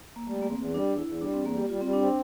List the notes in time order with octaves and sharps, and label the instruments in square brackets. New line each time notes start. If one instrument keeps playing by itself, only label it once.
[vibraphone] A#3
[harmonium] G3 [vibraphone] A3
[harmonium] E2 [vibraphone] A#3
[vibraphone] C4
[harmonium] E2
[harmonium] G3 [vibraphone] D4
[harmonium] E2
[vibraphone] E4
[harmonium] E2
[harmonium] G3 [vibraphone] D4
[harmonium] E2 [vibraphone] C4
[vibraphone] A#3
[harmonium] G3 [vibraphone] G4
[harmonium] G3 [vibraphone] F4
[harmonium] G3 [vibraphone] C4
[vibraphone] D4
[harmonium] C4